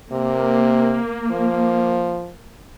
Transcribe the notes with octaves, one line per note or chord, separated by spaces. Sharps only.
C3 A#3
F3